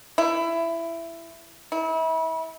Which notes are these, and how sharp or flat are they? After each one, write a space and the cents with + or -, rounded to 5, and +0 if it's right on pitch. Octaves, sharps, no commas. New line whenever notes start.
E4 +15
E4 -35